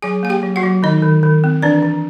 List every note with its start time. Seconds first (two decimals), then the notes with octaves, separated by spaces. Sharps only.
0.02 F#3 G#4 G#5
0.23 A#3 G#5
0.30 G4 G5
0.43 F#3
0.56 F#4 F#5
0.64 F#3
0.83 D#3 D#4 D#5
1.02 D#3
1.23 D#3
1.44 C4
1.62 E3 D4 D5
1.82 E3